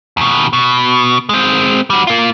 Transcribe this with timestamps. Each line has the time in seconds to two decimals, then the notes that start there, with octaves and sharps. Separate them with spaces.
0.17 D#2 B2
0.53 B2
1.29 G#3 C4
1.90 G3 F#4
2.07 A#3 F4